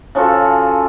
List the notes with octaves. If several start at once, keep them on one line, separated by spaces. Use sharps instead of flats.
C#3 F3 F#4 A4